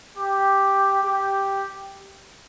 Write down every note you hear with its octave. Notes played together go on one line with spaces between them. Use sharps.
G4
G4